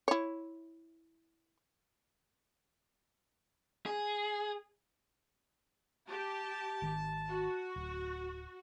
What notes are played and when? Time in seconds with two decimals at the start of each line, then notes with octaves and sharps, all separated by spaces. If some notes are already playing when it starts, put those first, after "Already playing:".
0.08 E4 C#5
3.86 G#4
6.09 G4 A5
6.82 G#1 D#3
7.28 F#4
7.76 D1